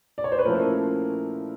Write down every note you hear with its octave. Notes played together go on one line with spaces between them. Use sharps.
D5
C#5
C5
B4
A#2 F3 A3 C#4 E4 A#4